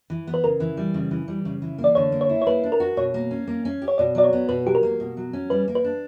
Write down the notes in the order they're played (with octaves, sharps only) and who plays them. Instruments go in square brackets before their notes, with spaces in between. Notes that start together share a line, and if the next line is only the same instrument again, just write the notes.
[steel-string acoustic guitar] E3
B3
[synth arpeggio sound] B4
[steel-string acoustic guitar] C#3 [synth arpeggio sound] A#4
[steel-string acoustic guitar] E3
G3
C#3
E3
G3
C#3
E3
A#3
[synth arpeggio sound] D5
[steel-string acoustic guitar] D3 [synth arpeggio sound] C#5
[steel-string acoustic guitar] A#3
[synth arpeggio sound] C#5
[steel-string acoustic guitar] E4
[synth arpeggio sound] C#5
[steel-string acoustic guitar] A#3 [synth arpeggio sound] B4
[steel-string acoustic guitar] D4
[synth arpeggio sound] A#4
[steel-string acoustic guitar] F#4
[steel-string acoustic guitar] B2 [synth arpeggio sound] C#5
[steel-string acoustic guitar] A#3
C#4
A#3
C#4
G4
[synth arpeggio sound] C#5
[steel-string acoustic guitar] B2 [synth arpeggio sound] D5
[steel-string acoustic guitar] F#3 [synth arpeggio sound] D5
[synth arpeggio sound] C#5
[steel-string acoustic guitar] B3
[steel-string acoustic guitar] B2 [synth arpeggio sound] B4
[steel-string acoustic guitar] F#3 [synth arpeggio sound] G4
[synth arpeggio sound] A#4
[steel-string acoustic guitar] A#3
B2
F#3
C#4
[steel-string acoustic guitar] G3 [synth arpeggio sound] B4
[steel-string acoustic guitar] A#3
[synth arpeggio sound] B4
[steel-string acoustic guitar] D4